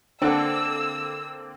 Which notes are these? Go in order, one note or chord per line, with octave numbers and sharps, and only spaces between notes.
D3 A#3 C4 D4 F#5 E6